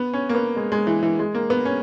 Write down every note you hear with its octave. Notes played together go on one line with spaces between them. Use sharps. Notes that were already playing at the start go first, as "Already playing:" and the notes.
Already playing: B3
C#4
A#3
B3
G#3
G#3
E3
E3
G#3
A#3
B3
C#4